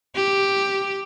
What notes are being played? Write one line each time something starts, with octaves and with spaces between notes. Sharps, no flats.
G4